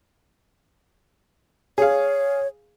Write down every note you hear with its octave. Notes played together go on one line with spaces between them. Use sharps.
G#4 C#5 F5